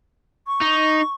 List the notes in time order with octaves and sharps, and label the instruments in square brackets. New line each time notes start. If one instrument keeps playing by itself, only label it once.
[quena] C#6
[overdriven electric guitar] D#4